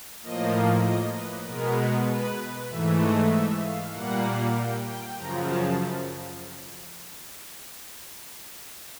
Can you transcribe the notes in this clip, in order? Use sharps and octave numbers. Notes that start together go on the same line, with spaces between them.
A2 F3 A#3 D#5
D#5
B4
B2 G#3 B3 A#4
B4
G#2 E3 A3 E5
D#5
E5
F5
A#2 G3 A#3 F#5
G5
G5
F#2 C#3 F3 A#5
A5